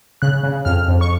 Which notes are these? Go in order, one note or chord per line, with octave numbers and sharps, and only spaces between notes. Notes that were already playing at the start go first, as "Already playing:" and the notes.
C#3 F#6
C#3
F2 F6
F2
C#6